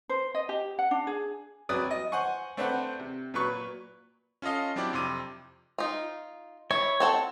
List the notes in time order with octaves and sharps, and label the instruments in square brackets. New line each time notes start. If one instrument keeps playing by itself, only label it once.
[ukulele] C5
D#5
G4
F#5
D4
G#4
[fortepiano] C2 F#3 B4 D5 D#6
D#5
C5 F#5 G#5 C#6
A3 C4 D4 B4 C5 F#5
C3
A#2 F#3 B4 C#6
[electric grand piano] C#4 F4 A4 D#5 F5
F#3 C4 D4 E4 G4 D5
F2 C3 C6 D6 D#7
[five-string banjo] D#4 F4
[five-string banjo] E4 [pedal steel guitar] C#5
[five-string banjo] C4 A4 F#5